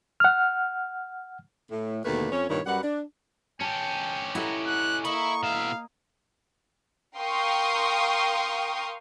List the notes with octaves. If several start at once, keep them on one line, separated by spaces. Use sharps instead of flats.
F#5 F6
A2
D#2 B2 D3 A3 A#3 B4
F2 C#4 C#5
G2 A#2 D#3 E4 A#4 C#5
F#2 F#3 G3 B4 F#5
D4
C#4 G4 G5 A5
D#4 E4 A4 F#5 A#5
F#6
A#3 D#5 E5 B5 C#6
B2 E5 F5
A#4 F5 G5 C6 C#6 D#6